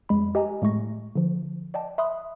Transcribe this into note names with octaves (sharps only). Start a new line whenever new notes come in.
F2 G#3 B5
G4 D#5 G#5 A#5
A2 G#3 A3 C#6 A#6
D3 F3
D5 D#5 G5 A5
E5 B5 C6 D#6 F#6